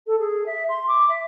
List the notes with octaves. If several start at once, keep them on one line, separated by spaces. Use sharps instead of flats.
A4
G#4
E5
C6
D6
E5